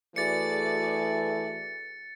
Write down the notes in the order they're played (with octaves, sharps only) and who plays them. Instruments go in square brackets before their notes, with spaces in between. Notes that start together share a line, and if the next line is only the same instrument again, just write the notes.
[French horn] E3 [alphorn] A3 [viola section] F#4 G#4 D5 [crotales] A6 C#7